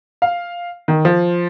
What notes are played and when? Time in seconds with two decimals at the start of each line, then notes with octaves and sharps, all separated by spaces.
0.22 F5
0.88 D#3
1.05 F3